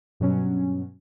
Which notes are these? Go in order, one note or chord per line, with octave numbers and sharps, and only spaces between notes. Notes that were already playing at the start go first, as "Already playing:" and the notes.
G2 B2 F#3 C#4